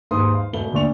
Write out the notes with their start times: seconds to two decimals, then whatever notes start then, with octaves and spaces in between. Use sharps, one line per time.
0.11 D#2 G#2 D#4 B4 C6 D#6
0.34 F5
0.53 E1 A3 B4 G7
0.72 D2 A#2 D4 D5 C#6 F7